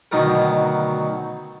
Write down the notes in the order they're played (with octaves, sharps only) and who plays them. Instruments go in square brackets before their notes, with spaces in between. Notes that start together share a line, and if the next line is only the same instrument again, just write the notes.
[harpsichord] D2 B2 D#3 F#3 B3 A#4